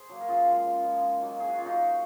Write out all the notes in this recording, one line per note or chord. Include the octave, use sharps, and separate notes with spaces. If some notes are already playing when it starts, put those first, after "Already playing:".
Already playing: G#4 C5
F#3 A#3
A#4
C#3 F4 G#4
F3 G#3
C#3
F3 G#3
D#3
F#3 A#3
D#3 G#4
F#4
A#3 F4
F#3 D#4 F#4
D#3